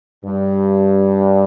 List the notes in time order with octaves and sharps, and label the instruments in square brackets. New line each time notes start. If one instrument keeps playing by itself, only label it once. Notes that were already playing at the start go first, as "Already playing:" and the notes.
[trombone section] G2